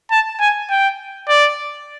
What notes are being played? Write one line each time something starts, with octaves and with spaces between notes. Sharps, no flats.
A5
G#5
G5
D5